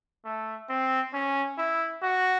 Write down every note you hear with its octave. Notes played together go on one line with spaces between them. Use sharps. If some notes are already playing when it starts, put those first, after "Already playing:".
A3
C4
C#4
E4
F#4